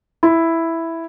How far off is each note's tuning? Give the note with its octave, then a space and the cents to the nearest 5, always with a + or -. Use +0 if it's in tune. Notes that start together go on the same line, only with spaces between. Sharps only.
E4 +0